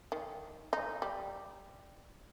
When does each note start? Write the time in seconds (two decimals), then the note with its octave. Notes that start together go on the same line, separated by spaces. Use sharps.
0.12 D#3
0.73 D#4
1.02 G3